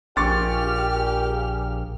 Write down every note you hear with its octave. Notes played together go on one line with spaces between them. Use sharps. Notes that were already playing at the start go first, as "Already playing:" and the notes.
A#1 A#2 G4 G#4 C#6 D6 F6 A6